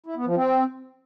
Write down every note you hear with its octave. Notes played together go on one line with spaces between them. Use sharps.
E4
B3
F3
C4